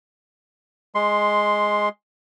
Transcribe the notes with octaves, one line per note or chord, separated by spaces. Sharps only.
G#3 C6